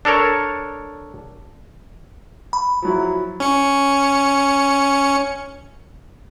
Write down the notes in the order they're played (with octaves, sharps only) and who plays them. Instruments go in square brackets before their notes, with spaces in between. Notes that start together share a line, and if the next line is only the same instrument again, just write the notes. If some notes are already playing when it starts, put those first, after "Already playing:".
[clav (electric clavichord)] D4 A4 A#4 C#5
[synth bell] B5
[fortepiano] F3 F#3 E4
[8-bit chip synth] C#4 C#7